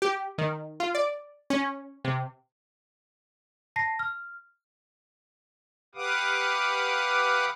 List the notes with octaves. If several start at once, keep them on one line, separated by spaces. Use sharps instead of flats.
G4
D#3
F4
D5
C#4
C3
A5 A#6 C7
F6
G4 B4 F5 F#5 D6 D#6